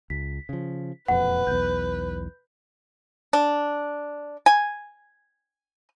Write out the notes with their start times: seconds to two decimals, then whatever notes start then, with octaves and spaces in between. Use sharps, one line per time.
0.10 C#2 B6
0.49 C#3 F3
1.08 E1 F2 A#2 B4 F#5
1.47 B1 E2 G6
3.33 D4
4.46 G#5